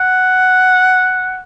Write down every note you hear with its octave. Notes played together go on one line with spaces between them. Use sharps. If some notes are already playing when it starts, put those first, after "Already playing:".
Already playing: F#5